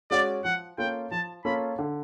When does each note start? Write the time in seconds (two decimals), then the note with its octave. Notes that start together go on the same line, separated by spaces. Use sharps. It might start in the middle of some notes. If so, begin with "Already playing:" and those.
0.11 G#3 C#4 F#4 D5
0.45 F3 F#5
0.78 A#3 C#4 F4 A4 G5
1.11 F3 A5
1.45 A#3 C#4 F4 A4 B5
1.79 D3